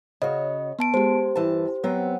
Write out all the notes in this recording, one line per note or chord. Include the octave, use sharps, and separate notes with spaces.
C#3 F#4 C#5 D#5
B3 A5 D7
G#3 G4 C5
G2 E3 A5
F#3 B3 C4